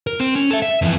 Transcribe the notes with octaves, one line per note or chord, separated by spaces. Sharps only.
A#4
C4
C#4
A4 E5
E5
F2 E3